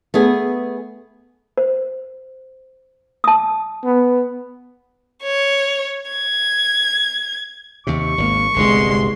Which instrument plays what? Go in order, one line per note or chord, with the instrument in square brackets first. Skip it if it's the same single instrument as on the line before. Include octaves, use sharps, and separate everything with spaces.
[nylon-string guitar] A3 B3 G#4
[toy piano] C5
A5 D#6
[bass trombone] B3
[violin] C#5
G#6
[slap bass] D#2 C3 [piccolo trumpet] C#6
[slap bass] G#1 C3 A#3
[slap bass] G1 C2 [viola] G#3 C6